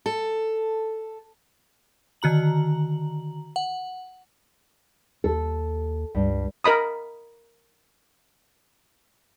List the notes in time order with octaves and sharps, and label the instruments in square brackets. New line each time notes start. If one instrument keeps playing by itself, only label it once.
[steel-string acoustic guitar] A4
[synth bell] D3 D#3 F#4 A#5 F#7
F#5
[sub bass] D#2 [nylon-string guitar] A4
[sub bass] C#2 [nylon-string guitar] G2
[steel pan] A#4 D#5 B5 D#6